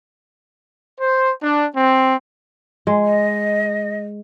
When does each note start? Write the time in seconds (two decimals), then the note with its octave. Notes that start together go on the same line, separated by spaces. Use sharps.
1.00 C5
1.42 D4
1.76 C4
2.87 G#3
3.05 D#5